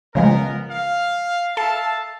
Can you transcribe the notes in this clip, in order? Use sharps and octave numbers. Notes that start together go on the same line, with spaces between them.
C#3 F3 G#3 B3 A#4
F5
A4 E5 F5 A5